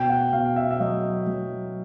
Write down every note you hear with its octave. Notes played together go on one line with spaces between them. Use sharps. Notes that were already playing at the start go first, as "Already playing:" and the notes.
Already playing: B2 G5
F#5
B2 F5
E5
E5
F#3 D#5
F#3